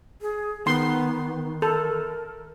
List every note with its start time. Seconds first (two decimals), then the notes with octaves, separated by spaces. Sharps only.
0.21 G#4
0.67 D#3 B3 C6
1.62 A4 A#4